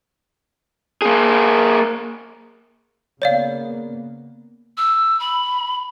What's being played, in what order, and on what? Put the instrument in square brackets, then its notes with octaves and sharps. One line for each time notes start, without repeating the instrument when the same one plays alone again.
[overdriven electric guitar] A#3 G#4
[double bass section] C#3 A#3 B3 [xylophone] C#5 D5 F5
[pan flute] E6
B5